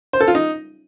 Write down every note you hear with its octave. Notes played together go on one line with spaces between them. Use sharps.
C5
A4
F4
D#4